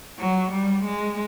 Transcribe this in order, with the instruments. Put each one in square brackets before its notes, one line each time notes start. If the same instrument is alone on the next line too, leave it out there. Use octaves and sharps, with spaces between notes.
[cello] F#3
G3
G#3